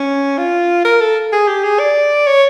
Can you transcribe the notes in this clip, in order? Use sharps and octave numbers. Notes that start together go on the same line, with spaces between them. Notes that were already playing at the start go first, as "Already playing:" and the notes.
Already playing: C#4
F4
A#4
A4
G#4
G4
G#4
D5
C#5